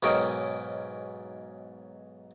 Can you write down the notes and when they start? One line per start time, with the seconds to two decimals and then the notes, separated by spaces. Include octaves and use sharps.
0.03 B1 G#2 C#4 A#4 D#5 G5